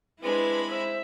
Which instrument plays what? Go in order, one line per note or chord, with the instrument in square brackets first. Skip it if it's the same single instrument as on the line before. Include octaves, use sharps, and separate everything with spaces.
[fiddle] G#3 B5 [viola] C4 D4 [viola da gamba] E4 [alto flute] B4
[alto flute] C5 [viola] E5